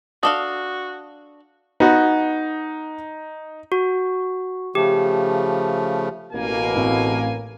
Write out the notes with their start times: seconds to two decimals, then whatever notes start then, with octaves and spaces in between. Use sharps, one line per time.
0.23 D4 F#4 A4 F5 D#6
1.80 B3 D#4 F#4
3.72 F#4
4.75 C#3 F3 A3 G4
6.33 A1 B2 A#3 G#5
6.75 A2 C4 F5